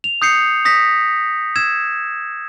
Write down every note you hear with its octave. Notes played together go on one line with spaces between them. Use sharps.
F7
D#6 G6 C7 C#7
D#6 A#6 B6
E6 G#6 E7